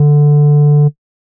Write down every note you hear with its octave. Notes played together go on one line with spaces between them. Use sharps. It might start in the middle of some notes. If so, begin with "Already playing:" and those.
Already playing: D3